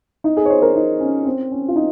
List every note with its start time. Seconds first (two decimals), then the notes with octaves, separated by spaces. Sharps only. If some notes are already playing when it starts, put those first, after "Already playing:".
0.24 D#4
0.37 G#4
0.45 C#5
0.50 C5
0.62 A#4
0.76 D#4
1.00 C#4
1.25 C4
1.51 C#4
1.68 F4
1.76 D#4